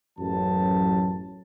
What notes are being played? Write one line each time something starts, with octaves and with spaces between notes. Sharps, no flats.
A1 F#2 F#3 A5